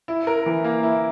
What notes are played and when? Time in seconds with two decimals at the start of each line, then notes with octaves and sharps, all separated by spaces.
0.08 E4
0.27 A#4
0.46 E3
0.64 A#3
0.83 E4